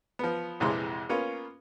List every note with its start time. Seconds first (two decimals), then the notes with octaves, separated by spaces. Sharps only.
0.19 F3 B3
0.60 A#1 F2 C3 E3 G#3 C6
1.09 A#3 B3 C#4 F4